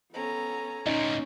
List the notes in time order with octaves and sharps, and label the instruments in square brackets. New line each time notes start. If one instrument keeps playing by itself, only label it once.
[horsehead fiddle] B3 A4 [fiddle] C#4 A#5
[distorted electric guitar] D2 A#2 [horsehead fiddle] C#4 [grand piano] D#4